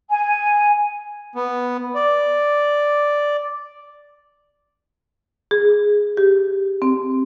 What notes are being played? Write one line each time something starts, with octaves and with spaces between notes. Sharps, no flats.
G#5
B3
D5
G#4
G4
C4